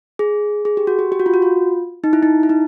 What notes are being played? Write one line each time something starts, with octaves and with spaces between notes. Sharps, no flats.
G#4
G#4
G4
F#4
G4
G4
F#4
F4
F#4
F4
D#4
E4
D#4
E4
D#4